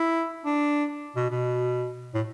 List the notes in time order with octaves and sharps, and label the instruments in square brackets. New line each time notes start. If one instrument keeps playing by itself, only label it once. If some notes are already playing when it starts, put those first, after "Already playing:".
Already playing: [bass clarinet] E4
D4
B2
B2
A2